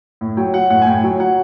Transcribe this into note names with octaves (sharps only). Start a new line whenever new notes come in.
A2
F#3 G5
F#3 F#5
A2 F#5
G#5
A2 G5
F#3
F#3 F#5